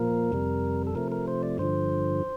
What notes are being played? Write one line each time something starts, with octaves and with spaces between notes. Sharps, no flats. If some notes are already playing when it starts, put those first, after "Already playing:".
Already playing: A#2 F3 A#3 A#4
F2 C3 G3
A4
C3 F3 A3 A#4
A#4
C5
D5
G2 D3 F3 C5